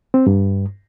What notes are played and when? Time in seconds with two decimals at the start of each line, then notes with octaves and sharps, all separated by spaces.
0.14 C4
0.27 G2